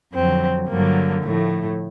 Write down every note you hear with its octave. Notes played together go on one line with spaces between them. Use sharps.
F2 D3 F#3 C4
G2 D3 F#3 A#3
A2 F3 A3